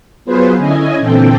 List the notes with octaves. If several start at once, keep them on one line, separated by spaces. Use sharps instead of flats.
F#3 B3 F4 G#4 B4 C5
D3 C#4 E4 D#5 G#5
A#2 D3 E3 C4 A4 G5